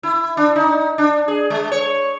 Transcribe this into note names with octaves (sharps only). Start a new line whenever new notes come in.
E4
D4
D#4
D4
G#4
G#3
C#5